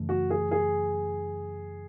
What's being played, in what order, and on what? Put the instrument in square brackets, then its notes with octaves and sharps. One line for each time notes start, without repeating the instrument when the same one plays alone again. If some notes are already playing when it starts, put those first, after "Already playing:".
Already playing: [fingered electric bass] F#2 C#3 E3 A3
[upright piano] F#4
G#4
G#4